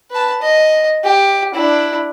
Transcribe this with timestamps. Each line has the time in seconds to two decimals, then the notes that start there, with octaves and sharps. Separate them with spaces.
0.11 B4 A5
0.42 D#5
1.04 G4
1.54 D4 E4